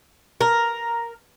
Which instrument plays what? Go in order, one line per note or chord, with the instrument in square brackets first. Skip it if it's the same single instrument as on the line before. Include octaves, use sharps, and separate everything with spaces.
[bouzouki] A#4